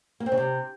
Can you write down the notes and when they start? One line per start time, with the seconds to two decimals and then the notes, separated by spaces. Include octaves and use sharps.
0.20 A#3
0.26 C4
0.32 C#3
0.37 C3